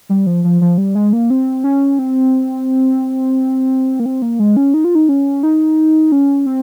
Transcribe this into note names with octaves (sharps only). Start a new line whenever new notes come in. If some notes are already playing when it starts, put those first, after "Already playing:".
G3
F3
F3
F3
G3
G#3
A#3
C4
C#4
C4
A#3
C4
A#3
G#3
C#4
D#4
F4
D#4
C#4
D#4
C#4
C4